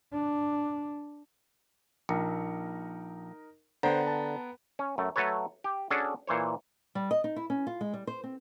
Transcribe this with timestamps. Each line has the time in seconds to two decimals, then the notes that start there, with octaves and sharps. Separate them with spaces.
0.14 D4
2.09 A#1 D#4 A#4 C#7
3.83 D3 B3 C5 G5 A#5
4.07 A5
4.79 C#4
4.98 F#2 A3
5.16 F#3 A3 A4 B4 C#5
5.64 G4
5.91 C#4 D4 F#4 G#4 A4
6.27 A#2 E3 C5 C#5
6.95 G3
7.11 D#5
7.24 D#4
7.36 E4
7.50 C#4
7.67 F4
7.81 G#3
7.94 G3
8.07 C5
8.24 C4